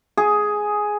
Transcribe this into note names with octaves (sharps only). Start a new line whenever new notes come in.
G#4